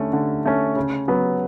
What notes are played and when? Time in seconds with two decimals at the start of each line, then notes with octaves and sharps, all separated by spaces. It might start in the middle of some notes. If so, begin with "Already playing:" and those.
Already playing: D3 A3 C#4
0.13 D3
0.45 A3 C#4
0.76 C#3
1.08 F#3 B3